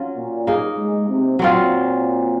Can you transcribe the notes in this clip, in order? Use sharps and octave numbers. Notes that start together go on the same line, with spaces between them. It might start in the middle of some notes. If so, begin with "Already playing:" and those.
Already playing: F#3 C#4 F4
A#2
A#3 D#4 G#4
G#3
C3
A#2 F#3 C4 F4